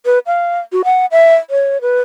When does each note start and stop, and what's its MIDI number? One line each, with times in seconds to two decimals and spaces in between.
0.06 0.19 71
0.26 0.59 77
0.72 0.82 66
0.85 1.06 78
1.11 1.35 76
1.50 1.81 73
1.81 2.02 71